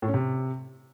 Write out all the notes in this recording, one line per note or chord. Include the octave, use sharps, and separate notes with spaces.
A2
C#4
C3